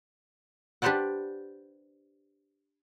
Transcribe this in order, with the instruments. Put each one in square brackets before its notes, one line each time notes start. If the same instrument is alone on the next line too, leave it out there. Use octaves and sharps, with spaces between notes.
[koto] D4 G4 B4 C5 D5 F#5